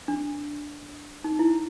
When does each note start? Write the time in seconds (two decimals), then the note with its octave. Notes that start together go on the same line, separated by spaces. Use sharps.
0.08 D4
1.24 D#4
1.39 E4